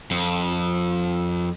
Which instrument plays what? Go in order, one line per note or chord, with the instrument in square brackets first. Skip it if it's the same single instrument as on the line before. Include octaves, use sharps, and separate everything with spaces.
[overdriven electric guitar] F2